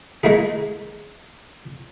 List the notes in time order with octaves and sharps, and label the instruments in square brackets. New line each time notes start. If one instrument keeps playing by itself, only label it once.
[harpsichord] G#3 A3 D#4 E4 G#4